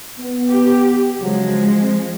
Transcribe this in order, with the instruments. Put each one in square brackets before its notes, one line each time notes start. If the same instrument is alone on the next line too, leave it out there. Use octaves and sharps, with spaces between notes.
[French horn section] B3
[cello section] G4
[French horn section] C#3 F#3 [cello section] F3 G#3
[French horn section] C4